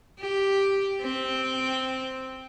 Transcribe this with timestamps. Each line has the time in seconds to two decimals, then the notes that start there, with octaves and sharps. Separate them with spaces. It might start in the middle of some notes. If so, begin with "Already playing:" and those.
0.20 G4
1.02 C4